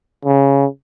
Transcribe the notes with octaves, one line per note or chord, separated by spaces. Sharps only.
C#3